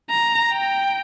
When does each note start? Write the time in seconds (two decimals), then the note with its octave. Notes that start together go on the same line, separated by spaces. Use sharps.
0.10 A#5
0.52 G5